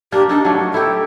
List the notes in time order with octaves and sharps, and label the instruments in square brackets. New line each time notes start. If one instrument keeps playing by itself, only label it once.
[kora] A#3 D4 [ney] G4
[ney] D4 [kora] D#4 A4
[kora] F#3 A3
[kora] E4 G4 [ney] A4